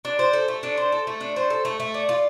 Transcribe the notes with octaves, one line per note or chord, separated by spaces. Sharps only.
D4
C5
A4
A3
D4
C5
A4
A3
D4
C5
A4
A3
A3
D5
F4